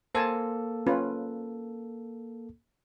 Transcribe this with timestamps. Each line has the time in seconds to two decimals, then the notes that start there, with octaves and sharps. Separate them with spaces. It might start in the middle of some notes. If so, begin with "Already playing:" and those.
0.15 A#3 A4 C5 G#5 A5
0.87 C#4 F4 B4